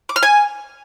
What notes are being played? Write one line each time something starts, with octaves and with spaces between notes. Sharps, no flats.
D6
F6
G#5